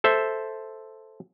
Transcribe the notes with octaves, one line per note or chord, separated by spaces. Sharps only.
A4 C5 E5